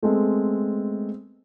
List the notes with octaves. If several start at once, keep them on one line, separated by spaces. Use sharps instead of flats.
G#3 A3 B3 C4 A4